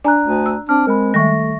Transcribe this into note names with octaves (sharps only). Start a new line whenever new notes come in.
D4 D5 G#5 A#5 F#6
D2
E6
C4 D4 F6
G#3 A#4 B5
D#3 G3 A3 E5 C#6 A#6